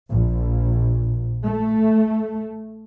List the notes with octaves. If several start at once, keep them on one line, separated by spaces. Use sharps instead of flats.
A#1
A3